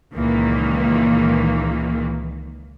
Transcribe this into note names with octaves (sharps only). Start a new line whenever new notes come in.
C#2 A#2 D#3 E3 A#3